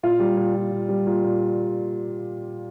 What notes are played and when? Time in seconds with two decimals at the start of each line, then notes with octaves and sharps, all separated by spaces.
0.03 A#2 F4
0.20 G3
0.37 A#2
0.55 A#2
0.71 A#2
0.89 G3
1.07 A#2
1.24 A#2